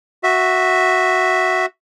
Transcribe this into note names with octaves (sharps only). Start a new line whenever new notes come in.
F#4 E5